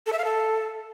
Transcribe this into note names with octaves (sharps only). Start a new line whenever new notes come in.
A4
E5
F5
A4